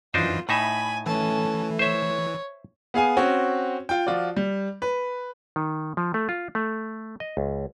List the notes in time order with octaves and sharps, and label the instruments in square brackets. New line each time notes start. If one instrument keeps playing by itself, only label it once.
[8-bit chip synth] F#2 E3 [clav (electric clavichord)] D4 D#4 C5 [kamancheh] F4
[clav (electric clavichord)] A2 D#4 E5 [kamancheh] G#5 [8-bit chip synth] B5
[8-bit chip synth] E3 [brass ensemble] A3 [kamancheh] C#4 A5
[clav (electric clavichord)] C5 E5 [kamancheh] C#5
[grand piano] B3 G#4 F5 G#5
C4 C#4 F#4
F4 G5
F3 F4 F#4 D5
G3
B4
[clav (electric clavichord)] D#3
F3
A3
F4
A3
D#5
C#2